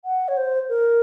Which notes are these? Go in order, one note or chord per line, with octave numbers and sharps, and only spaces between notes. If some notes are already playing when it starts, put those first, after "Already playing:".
F#5
C#5
C5
A#4